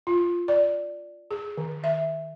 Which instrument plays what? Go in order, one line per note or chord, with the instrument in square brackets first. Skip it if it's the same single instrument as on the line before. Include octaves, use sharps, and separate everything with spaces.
[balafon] F4
D5
G#4
D#3
E5